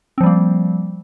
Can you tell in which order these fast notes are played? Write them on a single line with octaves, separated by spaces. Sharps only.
C4 F3 G3 A#3